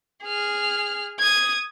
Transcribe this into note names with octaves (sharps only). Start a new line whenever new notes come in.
G#4 F6
D#6 G#6